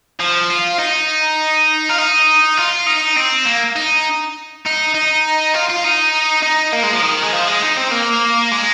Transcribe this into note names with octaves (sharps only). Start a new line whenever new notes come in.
F3
F4
D#4
F4
D#4
F4
D#4
C4
A#3
D#4
D#4
D#4
F4
F4
D#4
D#4
A#3
G#3
F3
D#3
G#3
F3
G#3
D#4
C4
A#3
G#3